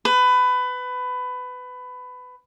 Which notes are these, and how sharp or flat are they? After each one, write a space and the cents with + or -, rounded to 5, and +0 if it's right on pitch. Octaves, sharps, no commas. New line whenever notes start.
B4 +20